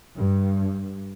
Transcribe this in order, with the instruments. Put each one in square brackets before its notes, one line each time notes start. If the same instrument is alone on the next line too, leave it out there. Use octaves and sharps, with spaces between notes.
[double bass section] G2